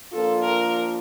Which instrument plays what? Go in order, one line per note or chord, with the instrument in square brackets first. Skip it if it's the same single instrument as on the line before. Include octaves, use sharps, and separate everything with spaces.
[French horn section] F3 A#3 D4 F4 [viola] A4
[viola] A#4